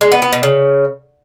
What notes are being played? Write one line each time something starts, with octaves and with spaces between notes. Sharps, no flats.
G#3
B3
B3
B2
C#3